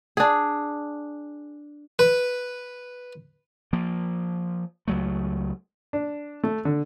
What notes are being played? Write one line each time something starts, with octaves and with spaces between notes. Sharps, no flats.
D4 G#4
B4
F3 A#3
C#2 F#3 A3
D4
A3
D3